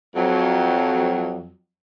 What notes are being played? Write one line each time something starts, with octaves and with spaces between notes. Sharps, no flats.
F2 F#3